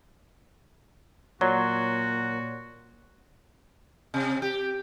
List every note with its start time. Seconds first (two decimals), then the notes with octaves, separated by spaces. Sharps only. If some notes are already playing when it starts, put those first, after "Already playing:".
1.41 A#2 F#3 F#4 C#5 D5 C6
4.14 C3
4.42 G4